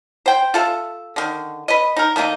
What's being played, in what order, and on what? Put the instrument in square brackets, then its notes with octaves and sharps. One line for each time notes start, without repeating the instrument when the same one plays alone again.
[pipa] C5 G5
F4 A4 E5
D3 D#3
B4 D#5
D#4 A#4
D#3 A3 A#3 D#4